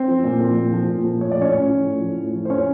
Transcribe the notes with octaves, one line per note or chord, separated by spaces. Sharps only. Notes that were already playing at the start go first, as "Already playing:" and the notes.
Already playing: C4 C5
F3
A#2
F3
A#2
F3
A#2
F3
A2 C#5
D5
F3 C#4 C#5
A2
F3
A2
F3
A2
F3
C5
C#4 C#5